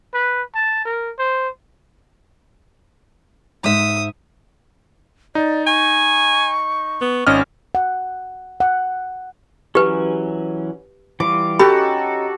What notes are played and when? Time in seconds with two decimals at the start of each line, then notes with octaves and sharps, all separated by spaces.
0.14 B4
0.55 A5
0.85 A#4
1.19 C5
3.64 G#2 E5 D#6
5.35 D#4 D5
5.67 G#5 C#6
7.01 B3
7.27 G#1 C#4 D#5 F6
7.75 F#5
8.60 F#5
9.75 E3 F#3 C#4 G4 B4
11.20 E3 G3 F4 D6
11.59 C#4 D#4 F#4 G4 A4 B5